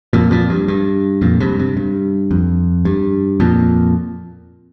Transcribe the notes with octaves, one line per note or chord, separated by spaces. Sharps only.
F2 A#2
F2 A#2
G2
G2
F2 A#2
G2 C3
G2 C3
G2
F2
G2
F2 A#2